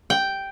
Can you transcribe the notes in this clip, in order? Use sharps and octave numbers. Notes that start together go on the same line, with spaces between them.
G5